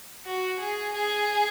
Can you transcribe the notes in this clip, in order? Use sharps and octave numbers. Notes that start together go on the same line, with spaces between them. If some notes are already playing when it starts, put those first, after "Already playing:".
F#4
G#4
G#4